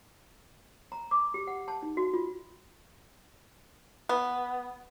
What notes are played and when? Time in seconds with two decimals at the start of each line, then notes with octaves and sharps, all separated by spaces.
0.92 A#5
1.11 D6
1.34 G4
1.47 F#5
1.68 A5
1.83 D#4
1.97 F#4
2.14 F4
4.09 B3